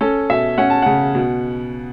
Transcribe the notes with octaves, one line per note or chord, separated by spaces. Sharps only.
C#4 A4
B2 E5
C#4 F#5
A5
C#3 F#5
B2